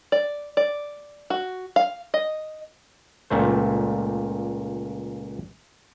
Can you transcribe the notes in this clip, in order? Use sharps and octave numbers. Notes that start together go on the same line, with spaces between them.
D5
D5
F#4
F5
D#5
C#2 A#2 A3 C5